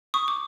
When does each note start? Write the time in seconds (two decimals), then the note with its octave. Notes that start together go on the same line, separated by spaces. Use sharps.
0.14 C#6 D#6
0.28 D6